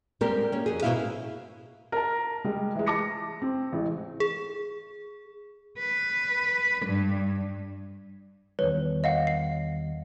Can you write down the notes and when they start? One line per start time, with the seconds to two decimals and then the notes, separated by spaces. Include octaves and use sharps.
0.21 G3 G#3 A#3 C4 G4 A#4
0.52 A#3 C#4
0.66 F2 G#4
0.82 G#2 B2 D#4 E4 E5 F5
1.92 A#4 A5
2.44 G3 G#3
2.75 E3 G#3
2.86 A5 D6 A#6 C#7
3.42 C4
3.73 A1 G#3
4.20 G#4
5.78 B4
6.86 G2
8.59 E2 D#3 G3 B4 C#5
9.04 D#5 F5 F#5
9.27 C7